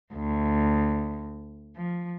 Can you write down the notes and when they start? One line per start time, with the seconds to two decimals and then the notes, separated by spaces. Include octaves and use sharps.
0.14 D2
1.77 F3